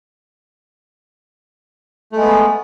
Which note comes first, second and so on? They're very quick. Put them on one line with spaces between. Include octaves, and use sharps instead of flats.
A3 G#3 B3